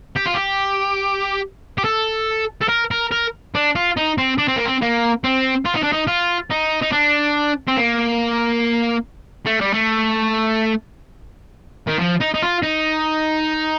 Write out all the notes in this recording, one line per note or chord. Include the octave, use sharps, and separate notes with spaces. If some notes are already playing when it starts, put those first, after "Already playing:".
G4
F4
G4
G4
A4
A4
A#4
A#4
A#4
D4
F4
D#4
C4
D4
C4
A#3
C4
A#3
C4
F4
D#4
D4
D#4
F4
D#4
D#4
D4
C4
A#3
A3
G3
A3
D#3
F3
D#4
D#4
F4
D#4